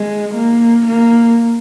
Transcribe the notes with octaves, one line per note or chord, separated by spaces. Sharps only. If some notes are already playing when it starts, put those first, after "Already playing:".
Already playing: G#3
A#3
A#3